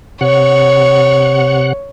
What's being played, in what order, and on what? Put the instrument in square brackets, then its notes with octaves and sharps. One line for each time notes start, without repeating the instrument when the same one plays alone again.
[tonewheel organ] C3 F#5 [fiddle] C#5